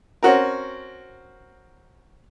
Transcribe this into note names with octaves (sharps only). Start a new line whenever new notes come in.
C4 C#4 F#4 A#4